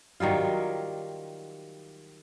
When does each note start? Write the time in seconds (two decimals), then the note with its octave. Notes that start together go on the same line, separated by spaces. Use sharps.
0.20 D#3 F#3 G3 F4